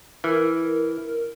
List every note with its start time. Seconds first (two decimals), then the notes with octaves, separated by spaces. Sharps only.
0.24 E3 A#4